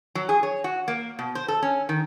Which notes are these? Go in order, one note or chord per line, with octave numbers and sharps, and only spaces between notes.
F#3
G#4
C#5
F#4
A#3
B2
C5
A4
C#4
D#3